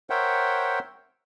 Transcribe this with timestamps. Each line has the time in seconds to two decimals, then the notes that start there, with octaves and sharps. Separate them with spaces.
0.10 A#4 C5 C#5 E5 F#5 G5